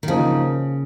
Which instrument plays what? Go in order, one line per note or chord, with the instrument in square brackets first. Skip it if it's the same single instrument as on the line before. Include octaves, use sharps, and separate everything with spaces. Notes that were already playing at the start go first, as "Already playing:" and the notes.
[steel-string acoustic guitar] D#3
[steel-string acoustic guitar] C#3 [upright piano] F3 A#3 D#4